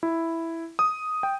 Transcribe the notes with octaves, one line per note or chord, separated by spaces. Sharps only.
E4
D#6
G5